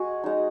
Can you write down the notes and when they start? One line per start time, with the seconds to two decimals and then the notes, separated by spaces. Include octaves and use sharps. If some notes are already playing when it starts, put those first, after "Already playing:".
Already playing: G#3 F#4 G#4
0.23 G#3 D#4